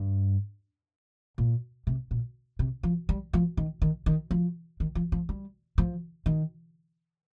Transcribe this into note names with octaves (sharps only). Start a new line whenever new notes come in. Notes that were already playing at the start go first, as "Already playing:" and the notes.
Already playing: G2
A#2
C3
A#2
C3
F3
G3
F3
D#3
D#3
D#3
F3
D#3
F3
F3
G3
F3
D#3